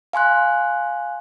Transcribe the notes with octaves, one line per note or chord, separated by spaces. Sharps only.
F5 G#5 C6 F#6